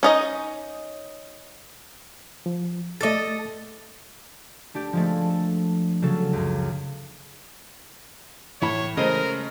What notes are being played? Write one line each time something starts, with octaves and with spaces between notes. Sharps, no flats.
C#4 D#4 D#5
F3
A3 A4 D#5 D6 A6
A3 D4 G4
F3 G#3 A3
A4
C#3 F#3 C#4 A4
C#2 F#2
A2 E3 A3 E4 C#5 B5
C#3 G#3 A3 A#4 C5 D#5